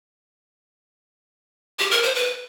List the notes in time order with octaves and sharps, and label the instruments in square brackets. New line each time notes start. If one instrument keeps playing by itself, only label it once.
[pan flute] G4
A#4
C5
B4